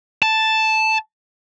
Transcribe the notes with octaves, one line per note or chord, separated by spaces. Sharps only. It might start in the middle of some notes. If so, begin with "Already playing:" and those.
A5